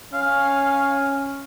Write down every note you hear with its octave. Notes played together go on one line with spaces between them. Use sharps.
C#4 F5